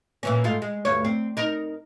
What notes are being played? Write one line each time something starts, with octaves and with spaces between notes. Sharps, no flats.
A#2 E3 C#4
G#2 A3 F4
G#3
D2 G2 C#5
C4
D#4 A#4